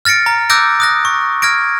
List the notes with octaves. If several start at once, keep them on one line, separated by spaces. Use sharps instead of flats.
F6 A6 A#6 C#7 D7
A#5
D6 E6 F#6 G6 A#6 D7
D#6 F#6 A#6
C#6
F6 G#6 A#6 D7